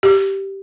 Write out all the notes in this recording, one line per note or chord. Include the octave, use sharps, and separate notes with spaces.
G4